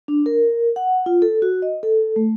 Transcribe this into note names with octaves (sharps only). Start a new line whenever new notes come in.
D4
A#4
F#5
F4
A4
F#4
D#5
A4
A3